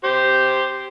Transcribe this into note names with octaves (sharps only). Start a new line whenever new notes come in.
G4 C5